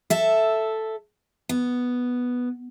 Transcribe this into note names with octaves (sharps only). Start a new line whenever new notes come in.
A4 E5
B3